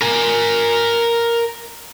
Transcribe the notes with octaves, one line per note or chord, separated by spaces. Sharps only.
A#4 G#5